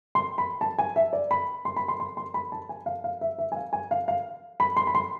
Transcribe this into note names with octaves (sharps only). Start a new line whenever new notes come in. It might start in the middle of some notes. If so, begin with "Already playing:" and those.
C6
B5
A5
G#5
E5
D5
B5
C6
B5
C6
C6
C6
B5
A5
G#5
F5
F5
E5
E5
G#5
F5
G#5
F5
F5
B5
C6
B5
C6